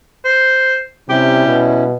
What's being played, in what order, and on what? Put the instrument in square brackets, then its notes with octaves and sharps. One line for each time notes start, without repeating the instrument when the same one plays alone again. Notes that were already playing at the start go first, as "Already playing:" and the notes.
[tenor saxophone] C5
[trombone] C3 [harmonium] G3 C#4 E4 [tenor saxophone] G4
[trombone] B2